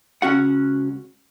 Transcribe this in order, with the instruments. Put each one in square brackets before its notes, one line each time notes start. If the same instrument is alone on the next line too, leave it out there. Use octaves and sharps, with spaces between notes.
[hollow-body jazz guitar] C#2 C#4 F#4 F#5